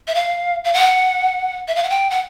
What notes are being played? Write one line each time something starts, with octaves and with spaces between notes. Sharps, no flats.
E5
F5
F5
F#5
E5
F5
F#5
G5
F#5